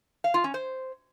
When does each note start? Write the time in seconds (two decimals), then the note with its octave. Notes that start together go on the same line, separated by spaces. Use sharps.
0.24 F5
0.34 F4
0.44 C#4
0.54 C5